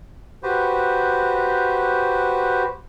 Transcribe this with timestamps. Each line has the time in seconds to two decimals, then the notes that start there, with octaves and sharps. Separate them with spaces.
0.43 F#4 G4 B4 C5